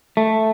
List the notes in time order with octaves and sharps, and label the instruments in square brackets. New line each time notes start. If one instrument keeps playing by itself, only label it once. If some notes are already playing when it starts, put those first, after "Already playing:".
[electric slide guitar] A3